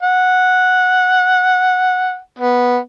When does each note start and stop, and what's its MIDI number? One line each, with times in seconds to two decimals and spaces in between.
0.03 2.18 78
2.39 2.78 59